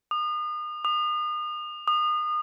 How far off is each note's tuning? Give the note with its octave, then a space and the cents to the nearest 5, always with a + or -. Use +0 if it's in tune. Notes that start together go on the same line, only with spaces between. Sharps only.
D#6 -35
D#6 -35
D#6 -30